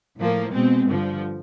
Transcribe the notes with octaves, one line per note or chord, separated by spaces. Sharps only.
A2 F3 A#3
B2 G#3 C4
G2 D3 F3